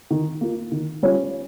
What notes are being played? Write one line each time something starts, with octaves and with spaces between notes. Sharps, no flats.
D#3
A#3 F4
D#3
G3 C#4 F4